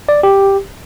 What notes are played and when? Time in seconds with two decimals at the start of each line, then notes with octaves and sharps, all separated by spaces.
0.09 D5
0.23 G4